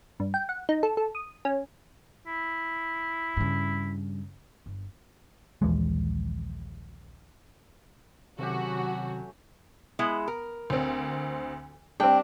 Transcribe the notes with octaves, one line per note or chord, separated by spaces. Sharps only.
G2
G5
F#5
D#4
A4
A4
D#6
C#4
E4
G2 C#3
G1
A#1 D#2 E3 G#3
C3 D#3 F#3 A3 C4 C#4 F#4 G4
G#3 B3 E4
A#4
D2 C4
G3 C4 D4 G5